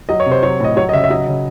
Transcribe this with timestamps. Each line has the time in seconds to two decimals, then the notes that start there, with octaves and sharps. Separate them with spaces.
0.09 F#3 D#5
0.20 C#5
0.26 C3
0.31 C5
0.43 F#3 C#5
0.60 A2 D#5
0.77 F#3 C#5
0.89 D#5
0.93 C#3 E5
1.04 E5
1.10 F#3 D#5
1.27 C#3